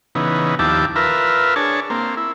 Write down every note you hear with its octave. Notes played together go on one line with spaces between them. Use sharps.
C#3 E3 B3 D#4
D#2 F3 E4 G4 A5 D6
F4 A#4 B4 E5
D4 G#4 C#5 A5
A#3 C4
E4